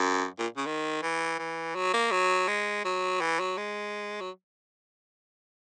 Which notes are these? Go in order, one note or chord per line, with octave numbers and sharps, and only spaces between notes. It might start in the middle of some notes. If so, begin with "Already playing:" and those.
Already playing: F#2
A#2
C#3
D#3
E3
E3
F#3
A#3
F#3
G#3
F#3
E3
F#3
G#3
F#3